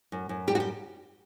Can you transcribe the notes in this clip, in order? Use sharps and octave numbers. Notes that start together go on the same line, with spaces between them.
F#2
F#2
G3 G4
F#4
G4